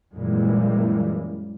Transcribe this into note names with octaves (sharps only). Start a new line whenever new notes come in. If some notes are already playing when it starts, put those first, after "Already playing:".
F#2 A#2 E3 G3 G#3 A#3